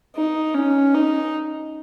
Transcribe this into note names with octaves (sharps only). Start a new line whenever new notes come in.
D#4
C#4
D#4